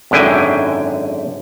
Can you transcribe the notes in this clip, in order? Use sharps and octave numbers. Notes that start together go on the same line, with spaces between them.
G#1 F#2 D3 E4 G5 G#5